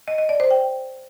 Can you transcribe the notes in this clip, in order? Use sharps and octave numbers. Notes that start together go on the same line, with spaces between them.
D#5
D#5
D5
C5
G5